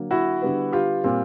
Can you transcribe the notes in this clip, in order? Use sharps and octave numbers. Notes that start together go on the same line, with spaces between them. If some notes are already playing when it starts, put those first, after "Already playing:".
Already playing: D3 F#3 A#3
E4 F#4
D3 G3 B3
F4 G4
A#2 G3 C4